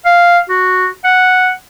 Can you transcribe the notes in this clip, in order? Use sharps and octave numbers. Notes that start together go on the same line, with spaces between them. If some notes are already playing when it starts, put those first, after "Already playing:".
F5
F#4
F#5